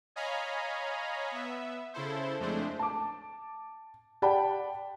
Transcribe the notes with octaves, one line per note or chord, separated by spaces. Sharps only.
C#5 D#5 F5 G#5 A#5 B5
B3 E5
C#3 E4 A4 C5
F2 G#3 A3 D4 C5
A5 D6
G4 D5 F#5 G5 A5 B5